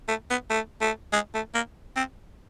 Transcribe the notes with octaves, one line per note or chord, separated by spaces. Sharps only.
A3
B3
A3
A3
G#3
A3
A#3
C4